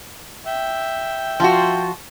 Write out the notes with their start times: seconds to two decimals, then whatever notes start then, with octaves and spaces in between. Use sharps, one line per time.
0.46 E5 G5
1.40 F3 F4 F#4